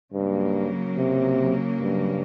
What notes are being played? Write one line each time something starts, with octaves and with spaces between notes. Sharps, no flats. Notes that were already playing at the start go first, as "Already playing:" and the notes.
G2 C#3 F#3 A#3
C3
G2